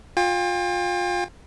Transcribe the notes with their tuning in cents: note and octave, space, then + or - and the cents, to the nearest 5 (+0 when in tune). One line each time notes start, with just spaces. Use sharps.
F4 +25 G5 +40